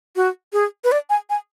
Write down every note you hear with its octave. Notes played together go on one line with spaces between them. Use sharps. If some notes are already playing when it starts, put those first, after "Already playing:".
F#4
G#4
B4
D5
G#5
G#5